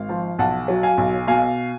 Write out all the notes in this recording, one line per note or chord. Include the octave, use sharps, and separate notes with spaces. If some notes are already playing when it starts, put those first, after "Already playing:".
Already playing: G#1 F5
F3
B1 F#5 A5
F#3
F5 G#5
B1
B2 F5 G#5